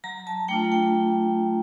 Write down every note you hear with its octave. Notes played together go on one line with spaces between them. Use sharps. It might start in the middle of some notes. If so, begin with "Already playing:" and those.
F#3 A#5
A5
A3 D4 F4 G5
G5